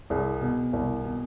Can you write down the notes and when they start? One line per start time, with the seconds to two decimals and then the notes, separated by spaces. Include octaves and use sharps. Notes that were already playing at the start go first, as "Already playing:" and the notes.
0.10 C2 G#4
0.41 B2
0.73 C2
1.04 B2